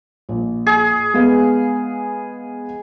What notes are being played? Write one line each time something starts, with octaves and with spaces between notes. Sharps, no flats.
A#1
G#4
G#3 B3 F5